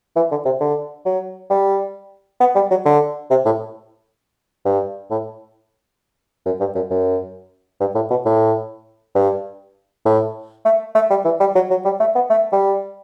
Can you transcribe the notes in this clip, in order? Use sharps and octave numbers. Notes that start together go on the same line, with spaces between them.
E3
D3
C3
D3
F#3
G3
B3
G3
F#3
D3
C3
A2
G2
A2
F#2
G2
F#2
F#2
G2
A2
B2
A2
G2
A2
A3
A3
G3
E3
G3
F#3
F#3
G3
A3
B3
A3
G3